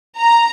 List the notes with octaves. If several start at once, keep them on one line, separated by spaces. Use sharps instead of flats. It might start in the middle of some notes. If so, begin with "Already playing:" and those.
A#5